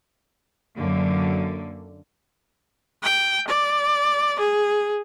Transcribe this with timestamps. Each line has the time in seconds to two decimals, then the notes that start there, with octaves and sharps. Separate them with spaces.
0.78 F#2 D3 A#3
3.03 G5
3.47 D5
4.39 G#4